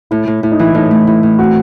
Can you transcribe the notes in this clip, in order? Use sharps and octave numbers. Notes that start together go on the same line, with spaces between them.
A2 E4
A2
A2 E4
D#4
E3 E4
A2 D#4
A3
A2 E4
A2
C4 F#4